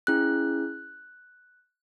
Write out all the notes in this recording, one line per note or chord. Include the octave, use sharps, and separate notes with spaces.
C#4 E4 G#4 F#6